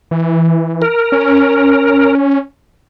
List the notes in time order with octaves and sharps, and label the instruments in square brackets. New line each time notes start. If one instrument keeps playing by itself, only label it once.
[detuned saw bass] E3
[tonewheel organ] A#4
[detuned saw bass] C#4